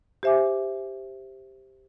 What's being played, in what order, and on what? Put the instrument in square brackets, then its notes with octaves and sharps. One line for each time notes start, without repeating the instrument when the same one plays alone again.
[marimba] G4 C5 E5 G#5 D6